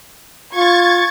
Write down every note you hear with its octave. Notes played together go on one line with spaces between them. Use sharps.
F4 C#6 G#6 A6